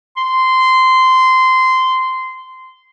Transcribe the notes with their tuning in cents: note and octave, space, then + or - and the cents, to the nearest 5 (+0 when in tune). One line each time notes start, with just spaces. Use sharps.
C6 -15